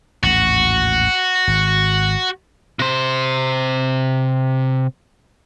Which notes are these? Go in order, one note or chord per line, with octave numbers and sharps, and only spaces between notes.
A1 D#2 G#2 F#4
G#1
C3 C5